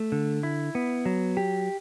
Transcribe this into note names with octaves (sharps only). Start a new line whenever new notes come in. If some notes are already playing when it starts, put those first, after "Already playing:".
Already playing: A3
D3
E4
B3
F#3
G4